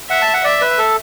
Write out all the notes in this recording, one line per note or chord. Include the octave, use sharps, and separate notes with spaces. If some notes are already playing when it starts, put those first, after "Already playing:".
E5 F#5
A5
F#5
D5 E5
B4
A4